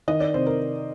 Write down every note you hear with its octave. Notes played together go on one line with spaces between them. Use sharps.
D#3 D#5
D5
C3 C5
A#4